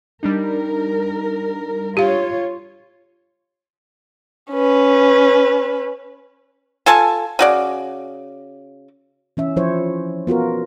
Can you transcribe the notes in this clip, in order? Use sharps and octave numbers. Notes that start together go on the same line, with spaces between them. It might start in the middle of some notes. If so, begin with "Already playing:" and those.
G3 D4 D#4 A#4
F4 G4 C#5 F5
C#4 B4
F4 A4 G#5 A5
C#3 F#4 D5
E3 C#4 E5
F3 E4 C5 C#5
B3 F4 F#4 A#4